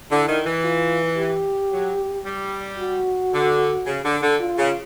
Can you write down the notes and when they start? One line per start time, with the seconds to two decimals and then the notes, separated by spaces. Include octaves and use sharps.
0.11 D3 E4
0.28 D#3
0.46 E3
0.64 F4
1.17 G4
1.72 F#3
2.25 G3
2.79 F#4
3.33 D3
3.86 C#3
4.05 D3
4.22 D3
4.40 F4
4.58 C#3